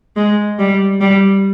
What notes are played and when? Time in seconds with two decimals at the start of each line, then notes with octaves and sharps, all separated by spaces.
0.16 G#3
0.59 G3
1.01 G3